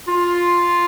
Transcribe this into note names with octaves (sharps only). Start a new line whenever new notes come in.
F4